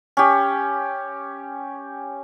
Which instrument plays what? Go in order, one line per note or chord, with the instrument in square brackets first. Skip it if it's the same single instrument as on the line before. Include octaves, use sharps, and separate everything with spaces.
[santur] C#4 G4